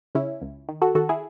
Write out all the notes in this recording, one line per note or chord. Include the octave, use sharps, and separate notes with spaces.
C#3 C#4 E4
C#2
D#3
F#4 A4
D#3 F#4 A4
E4 G#4